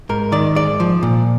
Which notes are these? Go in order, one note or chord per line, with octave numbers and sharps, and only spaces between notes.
G#2 A#4
D#3 D5
G#2 D5
F3
A#2